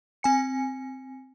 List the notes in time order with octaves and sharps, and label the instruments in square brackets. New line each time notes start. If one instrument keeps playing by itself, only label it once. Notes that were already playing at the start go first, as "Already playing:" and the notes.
[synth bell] C4 G#5 C#7